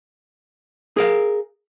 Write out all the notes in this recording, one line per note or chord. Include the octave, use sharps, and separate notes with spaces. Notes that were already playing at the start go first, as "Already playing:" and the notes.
G#4 A#4 F5